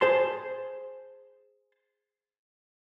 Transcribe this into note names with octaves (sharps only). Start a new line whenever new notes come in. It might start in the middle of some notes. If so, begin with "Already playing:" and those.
G#4 C5 A5 C6